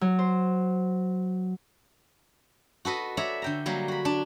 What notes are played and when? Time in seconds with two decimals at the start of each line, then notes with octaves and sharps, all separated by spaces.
0.01 F#3
0.19 C5
2.85 F#4 A4 B4 D#5
3.17 C#5 D5 E5 A#5 B5
3.42 D3 G5 A#5
3.66 F#3 G3 A#3
3.88 F#4 B5
4.05 D4